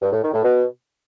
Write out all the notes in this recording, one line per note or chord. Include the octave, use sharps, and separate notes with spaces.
G2
A2
D#3
A2
B2